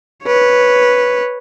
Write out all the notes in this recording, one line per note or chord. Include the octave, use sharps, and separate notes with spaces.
B4 C#5